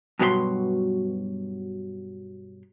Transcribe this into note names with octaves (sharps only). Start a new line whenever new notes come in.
G2 B2 F#3 G#4 B4 C6